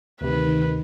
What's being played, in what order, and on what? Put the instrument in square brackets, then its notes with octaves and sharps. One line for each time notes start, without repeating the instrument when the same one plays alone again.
[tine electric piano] D2 C3 [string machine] D#3 [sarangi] B4